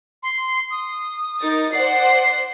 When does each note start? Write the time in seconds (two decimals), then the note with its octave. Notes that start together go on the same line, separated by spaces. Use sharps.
0.23 C6
0.71 D#6
1.40 D#4 A#4 A6
1.72 C5 D5 F#5 C7